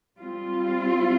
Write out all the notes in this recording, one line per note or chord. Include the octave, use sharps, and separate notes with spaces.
G3 C4 F4